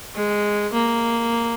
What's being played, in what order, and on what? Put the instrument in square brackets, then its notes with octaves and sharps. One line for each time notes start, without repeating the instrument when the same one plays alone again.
[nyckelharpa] G#3
A#3